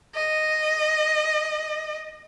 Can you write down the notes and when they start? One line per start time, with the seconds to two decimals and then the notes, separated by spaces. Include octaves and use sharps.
0.16 D#5